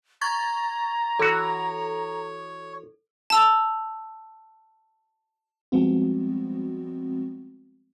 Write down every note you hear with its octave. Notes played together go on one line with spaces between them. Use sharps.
A#5 C#6 G#6 A6
E3 F#4 A4 C#5
A5 E6 F7
F3 G3 G#3 B3 C4 F#4